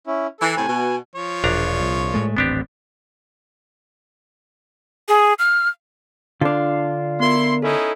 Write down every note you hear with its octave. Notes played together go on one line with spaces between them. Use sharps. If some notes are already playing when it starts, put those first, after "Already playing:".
C#4 E4
E3 A4
A2 C3 G#5
B2
F3 C#5
E1 A#1 D4 A#5
C2
A2 G#3 A3
D#1 A1 B3 C4 D4 G4
G#4
F6
D3 D4 F4 F5
B3 E4 A#4 C6
C#4 D#4 E4 A4